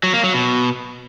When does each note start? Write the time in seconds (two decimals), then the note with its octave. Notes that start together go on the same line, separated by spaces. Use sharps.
0.03 F#3
0.14 A#3
0.24 F#3
0.34 B2